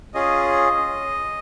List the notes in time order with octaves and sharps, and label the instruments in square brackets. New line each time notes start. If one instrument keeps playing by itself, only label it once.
[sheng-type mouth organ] C#4 F4 G#4 D#5